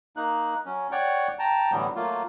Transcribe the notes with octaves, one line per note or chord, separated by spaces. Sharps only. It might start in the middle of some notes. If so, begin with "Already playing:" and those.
A#3 D#4 F#6
F#3 C#4
C#5 D5 F#5 G5 C#6
G5 A5 A#5
A2 D3 E3 F#3 G3 B3
F#3 A3 A#3 F4